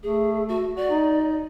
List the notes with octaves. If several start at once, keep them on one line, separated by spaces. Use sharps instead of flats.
A3 G#4
F#4
F#4 D5
D#4